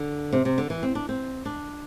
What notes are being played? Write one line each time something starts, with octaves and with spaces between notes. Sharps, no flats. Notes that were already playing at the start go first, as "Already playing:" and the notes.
Already playing: D3
C3
C3
D3
E3
C4
D4
C4
D4